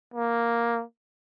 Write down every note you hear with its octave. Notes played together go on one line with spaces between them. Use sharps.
A#3